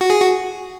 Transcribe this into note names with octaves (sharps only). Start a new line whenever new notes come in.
F#4
G#4
F#4